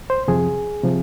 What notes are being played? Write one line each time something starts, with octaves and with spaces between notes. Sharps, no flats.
C5
F2 C3 F3 G#4
C3 F3